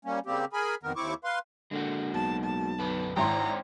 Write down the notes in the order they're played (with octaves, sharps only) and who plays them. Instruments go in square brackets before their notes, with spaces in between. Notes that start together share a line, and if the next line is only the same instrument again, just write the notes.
[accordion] G3 A#3 C#4
C#3 G3 A#3 C4 G4
G#4 A#4 G#5 B5
F2 C3 D#3 B3 A#4
D#2 C4 E4 C#6 D6
B4 F5 C6
[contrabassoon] D3 [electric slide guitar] G#3 A#3 F#4
[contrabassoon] B1 [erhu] A5
[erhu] A5
[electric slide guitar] F#2 D3 B4
[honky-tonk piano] G#1 E4 C6 [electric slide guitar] D4 C#5 G5 [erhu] A#5